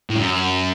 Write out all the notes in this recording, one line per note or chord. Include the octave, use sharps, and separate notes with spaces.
A2
F#2